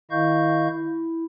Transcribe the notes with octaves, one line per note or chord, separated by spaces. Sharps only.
D#3 E4 D#5 F5 C#6 G6
E4